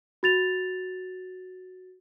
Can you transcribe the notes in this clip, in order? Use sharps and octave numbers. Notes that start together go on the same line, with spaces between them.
F#4 A6 F7